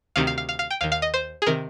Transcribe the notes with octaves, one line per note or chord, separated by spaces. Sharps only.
D2 C3 D#3 F5
F5
F5
F5
F5
G5
D#2 D#3 F5
F5
D#5
C5
G#4
C3 D#3 A#4